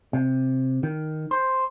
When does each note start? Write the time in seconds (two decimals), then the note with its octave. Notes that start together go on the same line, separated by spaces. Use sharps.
0.13 C3
0.83 D#3
1.31 C5